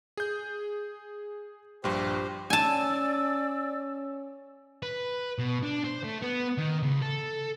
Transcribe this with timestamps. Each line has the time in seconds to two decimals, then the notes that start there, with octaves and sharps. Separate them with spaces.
0.17 G#4 G6
1.84 A#1 G2 G4 C5
2.50 C#4 D5 G#5 A5 E6
4.83 B4
5.38 B2
5.63 D4
5.84 C5
6.04 A3
6.22 B3
6.58 D#3
6.82 C#2
7.02 A4